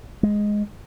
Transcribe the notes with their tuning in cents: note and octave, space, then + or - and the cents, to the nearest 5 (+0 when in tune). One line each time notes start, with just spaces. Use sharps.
G#3 +0